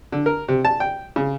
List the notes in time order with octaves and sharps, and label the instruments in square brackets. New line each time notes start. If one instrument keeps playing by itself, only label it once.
[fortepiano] D3
A#4
C3
A5
G5
C#3